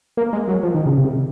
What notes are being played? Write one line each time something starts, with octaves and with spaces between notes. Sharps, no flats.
A#3
G#3
F#3
F3
D#3
C#3
C3